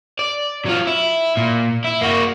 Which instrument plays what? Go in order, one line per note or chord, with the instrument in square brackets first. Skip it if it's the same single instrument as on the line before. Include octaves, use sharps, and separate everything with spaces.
[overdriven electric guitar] D5
F#3 F4
E4
A#2
E4
A#3 F#4